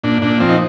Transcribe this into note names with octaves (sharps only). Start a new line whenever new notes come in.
A#2 D4
A#2 D4
F3 C4
D#4